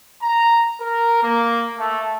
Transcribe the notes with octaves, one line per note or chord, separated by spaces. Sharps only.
A#5
A#4
A#3
A3